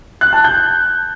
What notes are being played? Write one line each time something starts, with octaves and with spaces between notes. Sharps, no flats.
F#6
A5
G6